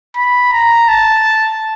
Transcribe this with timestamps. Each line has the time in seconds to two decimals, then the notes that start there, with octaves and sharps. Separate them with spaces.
0.16 B5
0.53 A#5
0.89 A5